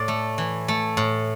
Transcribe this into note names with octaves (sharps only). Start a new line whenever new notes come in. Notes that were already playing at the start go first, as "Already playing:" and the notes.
Already playing: A2 D5
A3
E3
A3
A2